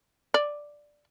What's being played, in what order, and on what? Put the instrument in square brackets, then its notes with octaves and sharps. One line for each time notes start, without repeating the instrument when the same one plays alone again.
[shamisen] D5